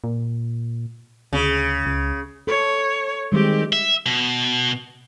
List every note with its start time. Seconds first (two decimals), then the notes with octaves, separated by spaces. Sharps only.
0.04 A#2
1.33 D2 C#3
1.86 C#2
2.47 A4 C#5
3.32 D#3 G3 G#3 C4 G4
3.73 E5
4.06 B2